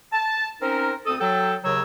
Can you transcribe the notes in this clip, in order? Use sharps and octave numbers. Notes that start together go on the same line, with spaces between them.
A5
C4 C#4 D#4 A#4
D2 C4 A4 D#6
F#3 A4 G5
D#2 C#3 F#3 C#5 E6